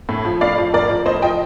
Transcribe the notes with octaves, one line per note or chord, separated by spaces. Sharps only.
A2
F3
A2 D5 F5
F3
A2 A#4 D5
F3
A2 C5 D#5
F3 D#5 G5